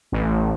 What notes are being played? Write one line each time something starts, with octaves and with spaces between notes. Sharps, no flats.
A1